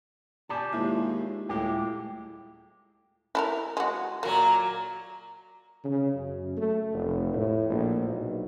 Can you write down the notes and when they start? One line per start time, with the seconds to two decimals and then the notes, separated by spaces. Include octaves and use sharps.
0.49 B2 G4 D5 G#5 A5
0.73 D#2 G#3 E4 F4
1.49 D#1 A2 G#3 G4
3.35 E4 A4 A#4
3.77 G#3 F#4
4.23 A#2 F#3 A#3
5.84 C#3
6.15 F#2
6.57 A3
6.93 F1
7.33 A2
7.70 A#1
8.08 B1